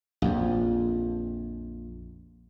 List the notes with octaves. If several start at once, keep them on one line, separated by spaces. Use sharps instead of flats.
A#1 F2